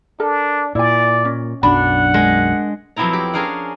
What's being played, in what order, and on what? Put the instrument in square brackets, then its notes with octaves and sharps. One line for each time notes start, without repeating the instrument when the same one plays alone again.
[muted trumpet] D4 [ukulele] A4 A#4
[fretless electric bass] A#2 [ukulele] E4 G#5 [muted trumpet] D5
[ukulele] C#4 D#5
[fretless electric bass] B1 F#2 [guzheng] D4 [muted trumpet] F#5 [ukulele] B5
[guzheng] G#3 [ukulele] A#4 D#5
[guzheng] F2 F#3 B3 C4 E4 A#5
G4
C#4 D4 G#4 A#4 F5 F#5